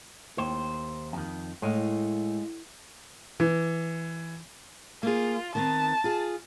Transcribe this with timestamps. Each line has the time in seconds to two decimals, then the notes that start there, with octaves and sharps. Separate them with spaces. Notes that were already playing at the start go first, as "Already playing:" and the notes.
0.38 D#2 C5
1.13 F2 D#3
1.62 A2 G#3 D#5 F5
3.40 E3
5.03 A#3 F4 G#4
5.55 D#3 B3 C4 A5
6.04 F4 G#4